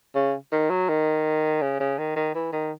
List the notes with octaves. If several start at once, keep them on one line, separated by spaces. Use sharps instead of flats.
C#3
D#3
F#3
D#3
C#3
C#3
D#3
D#3
E3
D#3